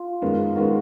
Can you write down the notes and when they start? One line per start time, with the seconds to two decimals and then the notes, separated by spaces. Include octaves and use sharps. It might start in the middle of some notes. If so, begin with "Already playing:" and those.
Already playing: F4
0.22 F#2 D#3 G#3 B3
0.55 F#2 D#3 G#3 B3 F#4